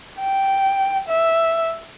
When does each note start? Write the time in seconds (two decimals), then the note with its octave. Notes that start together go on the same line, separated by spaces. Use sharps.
0.20 G5
1.08 E5